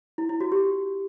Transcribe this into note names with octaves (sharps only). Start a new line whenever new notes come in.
E4
E4
F#4
G4